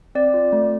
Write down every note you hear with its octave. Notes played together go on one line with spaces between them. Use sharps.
C4 D5
F4
A3